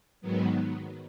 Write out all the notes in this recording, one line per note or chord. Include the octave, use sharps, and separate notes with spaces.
G#2 D#3 F#3 B3